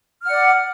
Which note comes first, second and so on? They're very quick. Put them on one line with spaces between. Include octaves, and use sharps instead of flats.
F6 F#5 D5